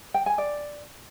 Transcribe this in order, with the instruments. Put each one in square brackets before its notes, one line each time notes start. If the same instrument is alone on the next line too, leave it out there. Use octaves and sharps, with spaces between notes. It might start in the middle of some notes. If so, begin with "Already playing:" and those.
[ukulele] G5
G#5
D5